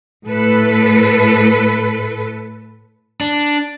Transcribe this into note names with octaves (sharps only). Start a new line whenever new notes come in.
A2 A4 B4
D4